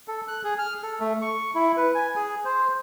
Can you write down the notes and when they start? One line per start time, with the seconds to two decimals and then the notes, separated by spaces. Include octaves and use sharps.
0.08 A4
0.28 F#6
0.44 G#4
0.59 F6
0.83 A4
1.00 A3
1.22 C#6
1.55 E4
1.77 B4
1.95 G#5
2.16 G#4
2.45 C5